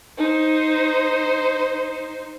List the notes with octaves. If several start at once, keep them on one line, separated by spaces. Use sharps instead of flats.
D#4 C5